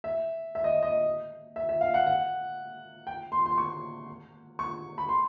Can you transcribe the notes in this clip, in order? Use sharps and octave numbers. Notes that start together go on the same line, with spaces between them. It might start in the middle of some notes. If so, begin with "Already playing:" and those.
E5
E5
D#5
D#5
E5
E5
F5
F#5
F#5
G5
C6
C6
C#6
C#6
B5
C6